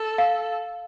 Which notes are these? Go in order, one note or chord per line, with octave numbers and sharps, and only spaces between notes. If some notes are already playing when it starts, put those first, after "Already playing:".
Already playing: A4
F5